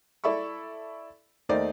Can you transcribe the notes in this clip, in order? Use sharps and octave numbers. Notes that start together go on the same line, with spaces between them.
E4 A4 D5 E5 B5 C#6
D#2 A3 D#4 C5 D5